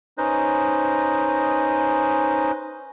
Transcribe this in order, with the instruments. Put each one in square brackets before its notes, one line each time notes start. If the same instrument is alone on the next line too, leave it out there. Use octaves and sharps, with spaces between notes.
[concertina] C#4 D#4 B4 C5 D#5